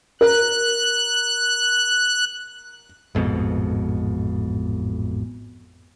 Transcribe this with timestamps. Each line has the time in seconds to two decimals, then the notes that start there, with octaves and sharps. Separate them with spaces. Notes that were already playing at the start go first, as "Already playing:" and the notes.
0.21 A#4 F#6
3.15 A1 F2 G#2 B2